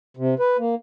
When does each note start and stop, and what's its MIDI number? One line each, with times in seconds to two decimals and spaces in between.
0.17 0.35 48
0.39 0.57 71
0.59 0.75 58